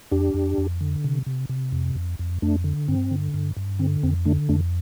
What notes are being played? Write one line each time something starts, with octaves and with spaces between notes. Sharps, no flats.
F2 D4 G4
F2
F2
D3
C3
C3
C3
F2
F2
F2
F2 A3 D4
D3
G2 C4
D3
G2
G2
D3 C4
F2 C4
D3 A3 D4
F2 A3 D4